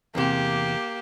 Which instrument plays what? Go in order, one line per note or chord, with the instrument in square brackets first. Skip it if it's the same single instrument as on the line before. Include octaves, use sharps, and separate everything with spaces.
[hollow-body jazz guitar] E2 C3 [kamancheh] A#3 G4